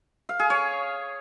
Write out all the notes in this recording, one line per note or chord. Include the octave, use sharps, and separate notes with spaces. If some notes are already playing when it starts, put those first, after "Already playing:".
F5
G#4
C#5